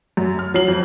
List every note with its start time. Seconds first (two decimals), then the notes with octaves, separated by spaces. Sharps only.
0.17 F#2
0.39 F6
0.54 F#3 C7 F#7
0.68 F2